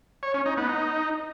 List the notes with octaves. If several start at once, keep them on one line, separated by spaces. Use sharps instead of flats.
C#5
C#4
D#4
B3
D#4